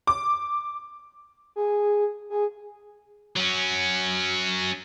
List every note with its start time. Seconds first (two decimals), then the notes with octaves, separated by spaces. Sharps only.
0.07 D6
1.56 G#4
2.30 G#4
3.36 F#3 C#4